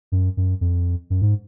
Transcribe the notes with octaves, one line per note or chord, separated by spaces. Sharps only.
F#2
F#2
F2
F#2
G#2